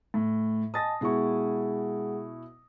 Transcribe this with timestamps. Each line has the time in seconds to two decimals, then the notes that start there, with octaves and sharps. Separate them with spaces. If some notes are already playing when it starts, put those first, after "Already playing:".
0.14 A2
0.74 D#5 G#5 A5 D#6 A6 A#6
1.01 B2 G#3 E4 G#4 F#5 C#6